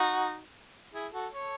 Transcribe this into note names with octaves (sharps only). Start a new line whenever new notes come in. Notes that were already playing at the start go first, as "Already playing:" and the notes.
Already playing: D#4 F#4
E4 G#4
F#4 A4
A4 C#5